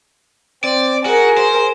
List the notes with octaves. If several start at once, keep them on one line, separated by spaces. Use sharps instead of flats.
C4 D5
F#4 G#4 A#4
C5